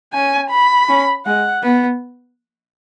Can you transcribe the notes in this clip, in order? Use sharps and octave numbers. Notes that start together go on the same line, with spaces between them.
C#4 G#5
B5
C#4
G#3 F#5
B3